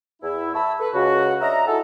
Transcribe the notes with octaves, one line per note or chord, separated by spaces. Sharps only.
E2 E4
E5 A5 B5 C#6 E6
A4 B4
C#2 C#3 F#4
D4 C#5 D#5 E5 A#5
D#4 E4 F#4 G#4 A4